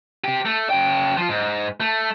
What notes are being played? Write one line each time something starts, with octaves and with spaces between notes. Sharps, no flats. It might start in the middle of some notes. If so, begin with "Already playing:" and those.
C4 G4
A3
C#3 G5
F3 F4
G#2
A3